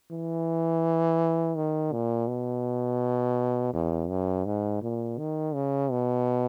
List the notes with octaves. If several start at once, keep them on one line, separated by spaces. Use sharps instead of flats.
E3
D#3
A#2
B2
E2
F#2
G#2
A#2
D#3
C#3
B2